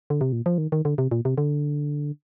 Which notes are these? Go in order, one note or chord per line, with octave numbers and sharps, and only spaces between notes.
D3
C3
A#2
F3
D#3
D#3
D3
C3
A#2
C3
D3